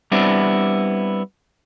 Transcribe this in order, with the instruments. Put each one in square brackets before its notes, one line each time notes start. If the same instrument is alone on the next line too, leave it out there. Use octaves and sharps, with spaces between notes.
[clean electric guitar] G3 B3 C4 D4 E4